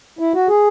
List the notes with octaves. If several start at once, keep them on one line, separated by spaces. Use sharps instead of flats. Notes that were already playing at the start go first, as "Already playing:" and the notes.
E4
F#4
G#4